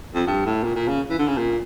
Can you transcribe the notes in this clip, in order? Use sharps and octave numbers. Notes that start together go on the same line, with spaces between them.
F2
G2
A2
A#2
A#2
C#3
E3
D3
C#3
A#2